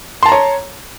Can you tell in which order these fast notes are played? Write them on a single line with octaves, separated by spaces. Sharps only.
C6 A5 A#5 C#5